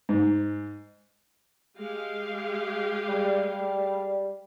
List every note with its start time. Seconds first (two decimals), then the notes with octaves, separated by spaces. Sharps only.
0.09 G#2
1.78 G#3 G4 F5
3.09 G3